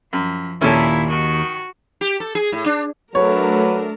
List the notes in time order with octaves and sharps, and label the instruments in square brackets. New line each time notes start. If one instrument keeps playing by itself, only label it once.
[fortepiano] F#2 [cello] F3
[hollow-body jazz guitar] D#2 [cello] A#2 [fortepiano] C#4 A4 [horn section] E4
[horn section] D#3 [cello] F#4
[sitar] G4
A4
G#4
A2
D4
[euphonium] F#3 [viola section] A3 D4 A#4 [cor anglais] B4 [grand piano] C#5